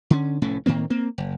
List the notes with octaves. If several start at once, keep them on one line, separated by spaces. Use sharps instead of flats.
D3 C#4
F1 A2 A3 C#4
A2 D#3 A#3 C4
A#3 C4
F#1